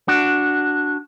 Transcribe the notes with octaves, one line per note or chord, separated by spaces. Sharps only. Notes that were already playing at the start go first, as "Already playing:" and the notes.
D4 F#4